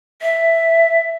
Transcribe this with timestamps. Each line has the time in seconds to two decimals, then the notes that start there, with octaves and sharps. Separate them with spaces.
0.22 E5